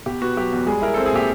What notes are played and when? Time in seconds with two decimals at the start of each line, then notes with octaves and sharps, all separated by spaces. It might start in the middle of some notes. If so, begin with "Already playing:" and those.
0.06 B2 G4
0.22 B3 F#4
0.37 F#3 G4
0.52 E2
0.67 G3 G#3 G#4
0.82 E4 A#4
0.94 C4 A4
1.06 G#4
1.12 A#2 G4